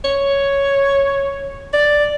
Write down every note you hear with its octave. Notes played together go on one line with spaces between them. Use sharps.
C#5
D5